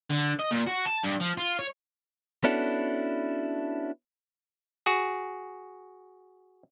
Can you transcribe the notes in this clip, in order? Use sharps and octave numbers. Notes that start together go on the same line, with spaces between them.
D3
D#5
A#2
F#4
A5
G2
F3
F4
C#5
B3 C#4 D4 E4 F#4 A4
F#4 G#4